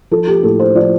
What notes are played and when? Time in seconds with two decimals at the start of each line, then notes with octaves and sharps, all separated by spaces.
0.11 F3 A4
0.27 G4
0.43 A2 A4
0.59 C5
0.75 F3 D5